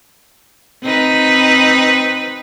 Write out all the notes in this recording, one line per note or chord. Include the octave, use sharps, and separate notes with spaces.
C4 D#4 B4